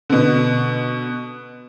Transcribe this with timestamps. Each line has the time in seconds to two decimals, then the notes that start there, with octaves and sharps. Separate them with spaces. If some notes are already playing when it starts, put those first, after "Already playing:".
0.09 B2 D3